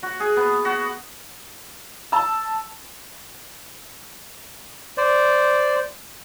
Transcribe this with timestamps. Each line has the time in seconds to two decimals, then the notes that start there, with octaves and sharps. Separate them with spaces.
0.03 F#4
0.20 G#4
0.36 B3
0.65 F#4
2.12 A5 E6
4.97 C5 D5